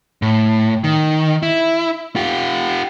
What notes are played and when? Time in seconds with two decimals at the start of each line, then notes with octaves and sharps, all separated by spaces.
0.22 A2
0.84 D#3
1.43 E4
2.16 F4 G4